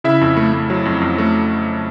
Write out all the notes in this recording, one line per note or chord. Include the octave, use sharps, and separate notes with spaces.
C#3 E4 E5
F2
A3
A3
F#3
F2
F2
A3